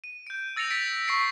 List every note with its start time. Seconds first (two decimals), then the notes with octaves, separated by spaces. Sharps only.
0.04 D#7
0.27 G6 D7
0.56 E6 A6 A#6 C#7 F7 F#7
0.70 B6 D7
1.08 C#6 B6 C7 D7